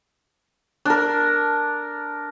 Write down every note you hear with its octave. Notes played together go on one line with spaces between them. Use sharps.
D4 A#4